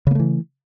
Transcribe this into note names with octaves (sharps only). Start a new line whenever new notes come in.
C#3 E3 A3 A#3